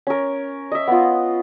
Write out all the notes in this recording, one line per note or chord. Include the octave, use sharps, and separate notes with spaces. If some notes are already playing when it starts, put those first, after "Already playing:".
C#4 A#4
D#5 E5
B3 F4